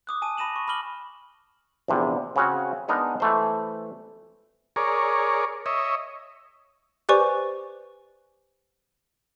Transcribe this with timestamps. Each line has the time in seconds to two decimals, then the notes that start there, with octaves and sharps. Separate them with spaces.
0.07 D6 D#6 F#6
0.22 G#5 A5 D#7
0.37 A5 B5 A#6 D#7 E7 F#7
0.56 C#6
0.68 B5 D6 F6 F#7 G7
1.88 A#1 E2 C3
2.36 C#3 C4 C#4 F#4
2.88 G#3 B3 D4 D#4 A#4
3.20 E3 A3 C5
4.76 G#4 A#4 C#5 D5
5.66 C#5 D#5 E5
7.09 G4 B4 C5 D5 G#5 C#6